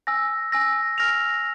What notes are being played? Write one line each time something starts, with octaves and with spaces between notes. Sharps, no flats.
G#5 E6 A#6
G#5 E6 A#6
F6 A#6 F7